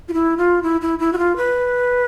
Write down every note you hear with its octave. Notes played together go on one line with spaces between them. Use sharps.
F4
E4
F4
E4
E4
E4
F#4
F4
B4